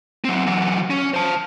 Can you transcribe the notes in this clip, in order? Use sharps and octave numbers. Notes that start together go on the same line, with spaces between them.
F#3 C4
E3 F#3
C#4
C5 A5